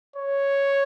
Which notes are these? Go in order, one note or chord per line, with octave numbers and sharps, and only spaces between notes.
C#5